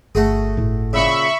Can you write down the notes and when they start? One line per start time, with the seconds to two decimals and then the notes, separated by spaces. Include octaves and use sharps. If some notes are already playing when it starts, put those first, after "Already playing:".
0.15 G1 A3 F#4 G#4
0.57 A2 E4
0.93 A#2 C#3 E5 B5 C#6